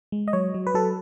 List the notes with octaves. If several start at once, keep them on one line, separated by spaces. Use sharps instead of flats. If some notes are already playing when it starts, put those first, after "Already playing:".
G#3
D#5
F#3 C#5
F#3
B4
F#3 A4